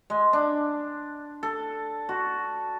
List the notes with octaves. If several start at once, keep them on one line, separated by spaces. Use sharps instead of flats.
G#3
D4
A4
F#4